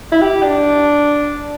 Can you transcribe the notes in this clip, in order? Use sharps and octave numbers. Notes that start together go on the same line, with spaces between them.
E4
G4
D4